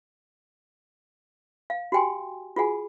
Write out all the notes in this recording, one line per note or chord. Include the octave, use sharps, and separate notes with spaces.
F5
F#4 G4 G5 G#5 C6
F4 F#4 G#4 F#5 G#5